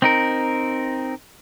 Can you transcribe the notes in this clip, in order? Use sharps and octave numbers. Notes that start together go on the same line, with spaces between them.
C4 D#4 A#4